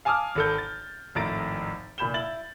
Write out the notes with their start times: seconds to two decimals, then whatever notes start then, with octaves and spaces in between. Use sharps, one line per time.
0.05 F5 G#5 A5 D6 D#6 F6
0.36 G#1 A4 G6
0.58 A6
1.15 G#1 F2 A2 A#5 A6 D7
1.98 F1 A#2 B5 G6 E7 G7
2.14 E4 A6 F#7